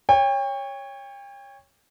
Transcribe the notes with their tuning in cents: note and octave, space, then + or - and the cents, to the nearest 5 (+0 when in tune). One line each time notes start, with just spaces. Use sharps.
C#5 +0 G5 +35